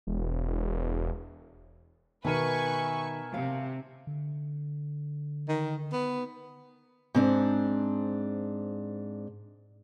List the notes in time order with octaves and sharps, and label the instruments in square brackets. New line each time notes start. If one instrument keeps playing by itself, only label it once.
[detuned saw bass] E1
[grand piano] B2 A#4 D#7 [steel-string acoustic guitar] D#3 [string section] B4 C#6 [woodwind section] E5 G#5
[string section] C3 [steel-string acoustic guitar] F5
[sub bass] D3
[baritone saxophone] D#3
B3
[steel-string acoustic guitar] G#2 C4 D4